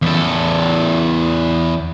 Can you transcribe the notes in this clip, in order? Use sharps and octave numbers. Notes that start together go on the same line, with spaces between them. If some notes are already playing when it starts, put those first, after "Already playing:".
E2 A4